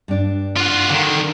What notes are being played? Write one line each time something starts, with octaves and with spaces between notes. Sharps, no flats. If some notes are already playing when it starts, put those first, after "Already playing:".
G2 D4
F4 F#4
D3 D#3 F#5